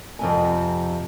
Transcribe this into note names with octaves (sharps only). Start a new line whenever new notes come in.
F2 C3 G#5